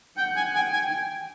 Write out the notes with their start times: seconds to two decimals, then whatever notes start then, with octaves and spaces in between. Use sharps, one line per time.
0.18 F#5 G5
0.36 G#5
0.55 G5 G#5
0.73 G#5